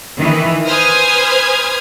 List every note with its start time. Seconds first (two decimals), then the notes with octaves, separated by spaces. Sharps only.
0.18 D#3 E3
0.65 B4 C5 G#5 D#6 F6 G#6